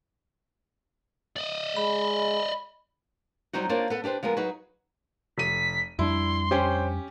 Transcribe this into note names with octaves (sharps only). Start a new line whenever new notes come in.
D5 D#5
G#3 B5
F#3 G3 C4 D#4 F#4
A#3 D4 F4 A#4 C5 C#5
B3 A4 B4
D4 G4 B4 C5
F3 G#3 B3 A#4
F#3 D#4 G#4 B4
F1 B6 D#7
F2 G3 D4 E4 C6
C#4 G4 C5 C#5 G5